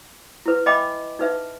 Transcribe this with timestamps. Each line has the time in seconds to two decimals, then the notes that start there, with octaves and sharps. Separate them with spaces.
0.46 E4 B4
0.66 D#5 E5 G5 G#5 B5 D6
1.19 D#4 B4 E5